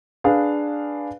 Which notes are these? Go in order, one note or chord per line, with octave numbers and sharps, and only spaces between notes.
D4 G#4 B4 F5